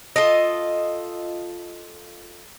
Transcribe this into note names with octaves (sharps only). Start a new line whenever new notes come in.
F4 A4 D#5